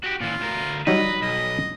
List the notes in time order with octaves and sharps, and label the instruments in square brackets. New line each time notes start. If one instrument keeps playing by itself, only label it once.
[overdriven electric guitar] F#4 G4
[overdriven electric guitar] A#2 E3 [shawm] F4
[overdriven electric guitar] D2 A#4
[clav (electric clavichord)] F#3 G3 D#4 [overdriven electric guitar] B4 [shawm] D#5
[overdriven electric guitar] B1 [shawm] D#5